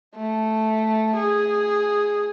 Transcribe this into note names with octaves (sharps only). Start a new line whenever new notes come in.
A3
G#4